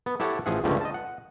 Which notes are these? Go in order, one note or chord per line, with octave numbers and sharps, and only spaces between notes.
B3
E4 G4 A4 C#5 F#5
A1 F3 G#4 E5 F#5
C#2 G2 D3 A3 C4 C#4
D#5 A5
F#5